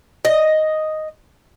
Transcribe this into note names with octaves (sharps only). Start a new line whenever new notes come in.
D#5